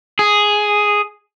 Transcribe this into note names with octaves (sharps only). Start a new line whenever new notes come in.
G#4